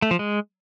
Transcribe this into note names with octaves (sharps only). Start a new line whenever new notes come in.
A3
F3
G#3